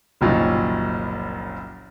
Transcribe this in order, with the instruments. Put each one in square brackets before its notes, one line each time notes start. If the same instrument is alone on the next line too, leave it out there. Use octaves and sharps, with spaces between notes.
[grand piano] F#1 C2 A#2 D#3 F3 F#3